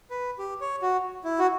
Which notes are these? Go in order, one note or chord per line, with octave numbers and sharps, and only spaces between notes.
B4
G4
C#5
F#4
E4
F#4